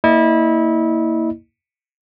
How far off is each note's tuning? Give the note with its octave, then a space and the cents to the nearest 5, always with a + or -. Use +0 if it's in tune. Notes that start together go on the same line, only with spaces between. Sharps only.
A#3 -5 E4 -25 D#5 -40